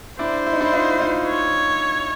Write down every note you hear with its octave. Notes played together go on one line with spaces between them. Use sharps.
D4 E4 C5
E4
D#4
D4 E4
D#4 F4
D#4 F4
C#5